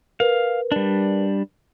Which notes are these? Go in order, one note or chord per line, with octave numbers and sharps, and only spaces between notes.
A#4 B4 F5
G3 D4